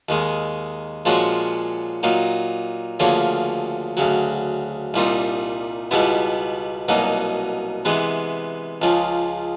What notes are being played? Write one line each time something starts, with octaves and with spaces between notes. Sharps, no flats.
D#2 D#3 G#3
A#2 F3 G#3 C#4 F#4
A#2 F#3 A#3 D#4
D2 C#3 F3 A#3 C#4
D2 C#3 F#3
C2 A#2 G3 C4 D#4
C#2 B2 G3 B3 E4
C2 B2 F#3 A#3 D#4
C3 E3 G#3 B3
C#2 C#3 F3